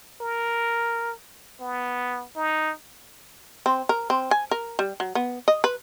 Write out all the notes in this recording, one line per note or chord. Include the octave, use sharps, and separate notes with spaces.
A#4
B3
D#4
C4
A#4
C4
G#5
A#4
G3
F#3
B3
D#5
B4